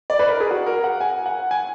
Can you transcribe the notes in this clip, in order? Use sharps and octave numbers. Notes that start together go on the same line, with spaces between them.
D5
B4
A#4
G#4
F#4
A#4
F#5
G#5
F#5
G#5